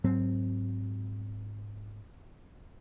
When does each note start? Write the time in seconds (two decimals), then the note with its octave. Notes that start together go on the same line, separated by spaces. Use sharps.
0.04 G#2 F#3 C4